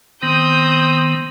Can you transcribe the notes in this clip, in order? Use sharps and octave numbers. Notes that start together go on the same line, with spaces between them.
D#3 B3 C4 D#6 G6